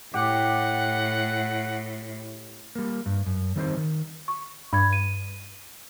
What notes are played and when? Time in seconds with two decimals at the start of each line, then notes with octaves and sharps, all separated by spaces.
0.14 A2 G4 F#5
2.75 G3 A#3
3.06 G2
3.26 F#2
3.56 D#3 G3 C4 D#4 B4 C5
3.77 D#3
4.28 C#6
4.73 G2 B5 G#6
4.93 D#7